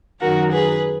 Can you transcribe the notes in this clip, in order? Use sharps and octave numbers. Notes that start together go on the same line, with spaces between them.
F#2 D#3 F#3 F#4 A#4
G#4 B4